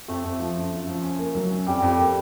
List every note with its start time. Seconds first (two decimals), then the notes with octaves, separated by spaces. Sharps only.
0.08 F2 A3
0.24 F2
0.40 F3
0.55 F#2
0.72 F#2
0.87 F3
1.03 C#4
1.19 A#3
1.35 F#3
1.50 C#4
1.67 F2 G3
1.82 F2
1.88 G3
1.98 A#3